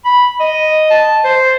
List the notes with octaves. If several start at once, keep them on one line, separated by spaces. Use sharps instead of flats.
B5
D#5
A5
C5